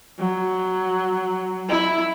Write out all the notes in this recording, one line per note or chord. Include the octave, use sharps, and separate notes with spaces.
F#3
E4